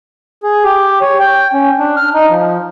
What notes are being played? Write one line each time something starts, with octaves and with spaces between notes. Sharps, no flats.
G#4
G4
C#5
G5
C#4
D4
F6
D#4
F3